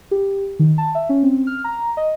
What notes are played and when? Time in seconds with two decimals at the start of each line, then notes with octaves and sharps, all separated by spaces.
0.11 G4
0.59 D#3
0.78 A5
0.95 E5
1.09 C#4
1.23 C4
1.47 F6
1.64 A#5
1.97 D#5